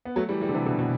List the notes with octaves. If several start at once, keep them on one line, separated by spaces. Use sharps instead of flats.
B3
F#3 A3
E3 G3
E3 G3
D3
C3 E3
B2 D3
B2